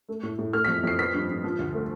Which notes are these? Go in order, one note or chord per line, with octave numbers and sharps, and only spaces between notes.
A3
A2
A2
A3 F6
B6
F2
F2 C7
B3 B6
G2
G2
F3
D2
A3